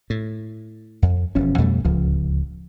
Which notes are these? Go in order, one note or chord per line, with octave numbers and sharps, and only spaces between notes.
A2
F2
E1 B2 F3 C#4
F2 B2 G3 A3
D1 C#2 C#3 F3